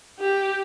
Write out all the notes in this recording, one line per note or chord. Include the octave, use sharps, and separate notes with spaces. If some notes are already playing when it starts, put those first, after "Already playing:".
G4